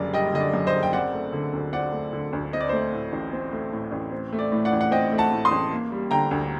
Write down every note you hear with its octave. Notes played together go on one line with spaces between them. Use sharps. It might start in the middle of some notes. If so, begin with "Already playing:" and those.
Already playing: F#1 F#2 D3 G3 D5
G3 D#5 G5
D3 D#5
D5
F#2
C5 D#5
F#1
G5
C4 D5 F#5
A3
D3
D2
C4 D5 F#5
A3
D3
D2
C4 D#5
D5
C5
A3 D5
A2
A1
C4
A3
A2
A1
C4
A3
D5
A2
D5 F#5
A1
F#5
C4 D#5 G5
A3
F#5 A5
A2
C6 D#6
A1
A#3
G3
D3 G5 A#5
D2